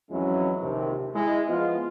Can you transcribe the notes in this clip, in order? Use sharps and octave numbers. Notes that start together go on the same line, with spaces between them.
F2 E3 F#3 G#3 C#4 E4
A#1 D#2 C3
G#3 E4
F3 G#3 B3 F4